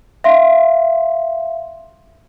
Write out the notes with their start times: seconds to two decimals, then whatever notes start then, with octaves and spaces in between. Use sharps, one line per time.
0.24 E5 F5 C6